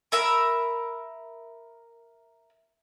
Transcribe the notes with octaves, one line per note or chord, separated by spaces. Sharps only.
A#4 E5 B5